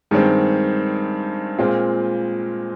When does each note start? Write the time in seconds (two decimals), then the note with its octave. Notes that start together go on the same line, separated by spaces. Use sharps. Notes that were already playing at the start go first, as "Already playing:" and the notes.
0.11 G2 D#3 G#3 C4
1.58 A#2 G#3 C4 F4